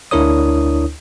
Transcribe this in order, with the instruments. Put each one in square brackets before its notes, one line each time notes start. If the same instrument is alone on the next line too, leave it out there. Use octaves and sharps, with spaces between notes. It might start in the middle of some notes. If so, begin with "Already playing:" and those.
[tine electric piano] D2 D4 E4 A#4 C#5 D#6